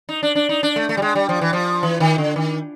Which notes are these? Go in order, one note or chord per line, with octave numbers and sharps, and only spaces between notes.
D#4
D4
D4
D#4
D4
A3
A3
G3
G#3
G3
F3
E3
F3
E3
D#3
D3
D#3